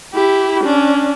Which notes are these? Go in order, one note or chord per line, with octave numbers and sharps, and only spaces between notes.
E4 G4
C#4 D4